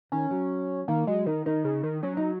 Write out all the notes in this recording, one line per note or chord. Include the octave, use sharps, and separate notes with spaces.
D#3 C#4
F#3
D#3 A#3
F#3 G#3
D#3 D#4
D#3 D#4
C#3
D#3
F#3 C#4
D#4